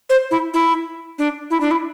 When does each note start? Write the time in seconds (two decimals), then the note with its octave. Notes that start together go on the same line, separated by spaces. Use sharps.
0.10 C5
0.31 E4
0.54 E4
1.18 D4
1.50 E4
1.60 D4
1.71 E4